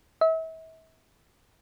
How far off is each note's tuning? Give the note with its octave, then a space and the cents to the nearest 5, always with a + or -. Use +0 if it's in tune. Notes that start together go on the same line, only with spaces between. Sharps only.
E5 -35